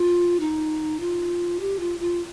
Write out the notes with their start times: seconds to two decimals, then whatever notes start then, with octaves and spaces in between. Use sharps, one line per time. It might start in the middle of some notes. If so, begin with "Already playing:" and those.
Already playing: F4
0.40 D#4
1.00 F4
1.60 G4
1.80 F4
2.00 F4